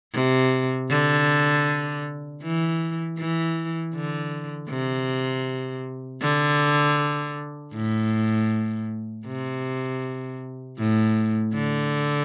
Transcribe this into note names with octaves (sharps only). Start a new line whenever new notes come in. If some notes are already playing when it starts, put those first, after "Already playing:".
C3
D3
E3
E3
D3
C3
D3
A2
C3
A2
D3